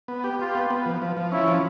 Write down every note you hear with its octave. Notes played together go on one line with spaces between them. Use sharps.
B3
G4
F4 G4
B3
B3
F3
F3
F3
C#4 E4
F3